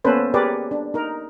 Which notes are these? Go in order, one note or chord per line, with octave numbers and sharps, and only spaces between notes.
A#3 B3 C#4 A4 B4 C5
G4 G#4 A#4 B4 C#5 D5
D4
D#4 A#4